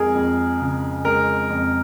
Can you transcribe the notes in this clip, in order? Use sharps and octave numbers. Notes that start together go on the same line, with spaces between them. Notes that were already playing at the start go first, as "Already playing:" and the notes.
Already playing: F2 G#3 G#4 A#4
F2
C#3
G#3 A#4
F2